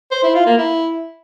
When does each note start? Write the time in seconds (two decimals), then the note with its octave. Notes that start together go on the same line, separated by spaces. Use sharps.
0.11 C5
0.23 E4
0.35 F4
0.46 A#3
0.58 E4